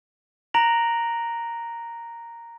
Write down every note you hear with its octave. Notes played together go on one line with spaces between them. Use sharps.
A#5 F#6 A#6 D7 F7 F#7